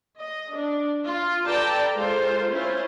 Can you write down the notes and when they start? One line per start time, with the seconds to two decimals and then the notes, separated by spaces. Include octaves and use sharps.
0.19 D#5
0.54 D4
1.06 F4
1.47 A4 B4 D5 G5 A5 A#5
1.95 G#3 F4 A4 A#4 C5
2.52 C#4 E4 F4 C5